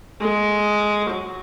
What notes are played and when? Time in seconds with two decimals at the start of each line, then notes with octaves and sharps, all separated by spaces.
0.22 G#3
1.10 F#3